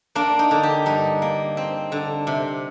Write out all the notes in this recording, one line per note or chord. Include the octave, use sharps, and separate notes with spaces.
A#3 D4
D#4
D3
G4
G2 D#4
A#3
C4
D3
C3